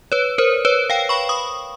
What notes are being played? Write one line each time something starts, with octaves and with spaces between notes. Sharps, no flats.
B4 C#5
A#4 C5
B4 C#5
F5 G5
B5 C#6
C#6 D#6